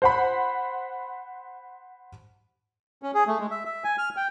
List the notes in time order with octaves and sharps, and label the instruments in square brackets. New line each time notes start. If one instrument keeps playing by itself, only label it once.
[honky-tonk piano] C5 F#5 B5
[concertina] C#4
G#4
A3
G#3
E5
E5
G#5
F6
G5